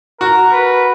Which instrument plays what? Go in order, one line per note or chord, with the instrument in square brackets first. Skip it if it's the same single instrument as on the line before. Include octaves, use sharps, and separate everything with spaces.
[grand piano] F#4 [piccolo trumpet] A#4
[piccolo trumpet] B4